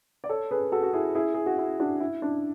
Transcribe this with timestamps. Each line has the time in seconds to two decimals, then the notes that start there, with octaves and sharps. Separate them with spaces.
0.24 D5
0.29 A4 C#5
0.51 G#4 B4
0.72 F#4 A4
0.83 F#4
0.93 E4 G#4
1.15 E4 G#4
1.34 G#4
1.46 F#4
1.58 E4
1.80 D4 F#4
2.00 E4
2.22 D4